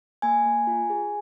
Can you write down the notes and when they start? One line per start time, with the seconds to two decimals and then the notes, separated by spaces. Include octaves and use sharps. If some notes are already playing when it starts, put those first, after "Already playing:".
0.22 A#3 G#5
0.46 A#3
0.67 F4
0.90 G#4